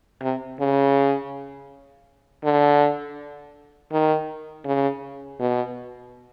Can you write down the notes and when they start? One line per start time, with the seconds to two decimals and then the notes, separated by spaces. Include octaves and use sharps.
0.22 C3
0.60 C#3
2.44 D3
3.92 D#3
4.65 C#3
5.40 B2